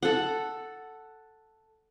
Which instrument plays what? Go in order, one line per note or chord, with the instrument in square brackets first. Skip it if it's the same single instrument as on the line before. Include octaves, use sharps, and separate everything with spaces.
[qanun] A4 F#5